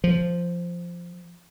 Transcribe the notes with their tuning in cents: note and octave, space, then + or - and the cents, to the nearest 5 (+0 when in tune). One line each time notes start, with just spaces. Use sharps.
F3 -5